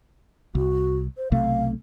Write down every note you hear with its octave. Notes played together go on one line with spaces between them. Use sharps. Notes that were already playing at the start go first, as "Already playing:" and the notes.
C2 F#4
C5
B1 C3 A3 F5